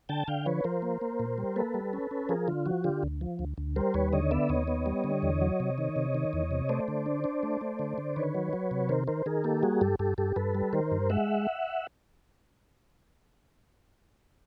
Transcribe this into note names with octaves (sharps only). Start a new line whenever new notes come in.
D3 G5 A5
D3 F5 G5
F3 B4 C#5
F3 A#4 C5
A#3
A#3
A#2
G3
A#3 A4 B4
G3
C#4
C#4
F3 G#4 A#4
D3 F4
F3 F#4
D3 F4 G4
D2
F3
D2
D2
G3 A#4 C5
D#2 B4 C#5
D3 C#5 D#5
B3 D5 E5
D#2 C#5 D#5
B3
G3
D3
E2
F#3
C3
D#3
C3
D#3
E2
C3
A3 C5 D5
D3
D4
D4
A3
A3
D3
D3
D#3 B4 C#5
F#3
F#3
C3
D#3 A#4 C5
D#3 A#4 C5
D#3 G#4 A#4
A#3 G4 A4
G3 F#4 G#4
G2 G4 A4
G2 G4 A4
G2 G4 A4
G2 A4 B4
G3
D#3 A#4 C5
G2
G#3 E5 F#5